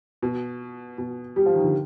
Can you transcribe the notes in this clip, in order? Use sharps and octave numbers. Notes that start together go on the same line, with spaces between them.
B2
B2
G3
F3
D#3
D3